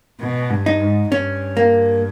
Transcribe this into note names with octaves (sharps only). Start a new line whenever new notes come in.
B2
G2
D#4
G#2
G2 C#4
A#3